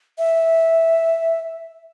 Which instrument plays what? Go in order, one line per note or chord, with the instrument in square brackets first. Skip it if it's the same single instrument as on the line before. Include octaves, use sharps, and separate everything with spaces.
[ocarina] E5